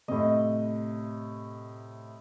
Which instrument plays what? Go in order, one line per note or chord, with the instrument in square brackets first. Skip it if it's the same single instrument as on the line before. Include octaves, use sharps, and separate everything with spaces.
[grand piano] A2 C3 [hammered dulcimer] D#5